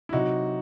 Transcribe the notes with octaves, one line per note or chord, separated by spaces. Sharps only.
E4
C3 F#3 D#4 F#4